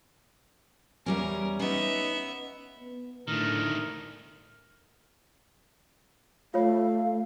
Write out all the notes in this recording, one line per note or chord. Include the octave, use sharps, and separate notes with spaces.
E2 G3 C#4 A#4
B3 C#4 D#4 E5
B3
A2 D3 D#3 A3 A#4
A3 F4 C#5 F5